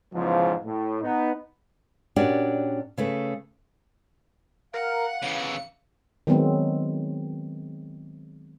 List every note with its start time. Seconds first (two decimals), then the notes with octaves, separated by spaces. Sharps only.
0.13 B1 E2 G#2 C#3 F3
0.65 A2
1.02 B3 D#4
2.16 A#2 C#4 D4 F#4 G4
2.98 C#3 A3 B4
4.74 A#4 F5 F#5
5.22 C#3 E3 C#7
6.27 D#3 F#3 G#3 B3 C4